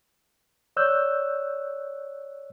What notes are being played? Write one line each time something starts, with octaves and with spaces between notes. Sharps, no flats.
C#5 D5 E6 F#6 G6